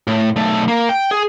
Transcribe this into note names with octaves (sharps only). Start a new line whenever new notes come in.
A2
B1 A3
A#3
G5
G#4